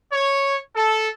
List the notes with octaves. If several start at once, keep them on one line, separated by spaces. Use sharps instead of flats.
C#5
A4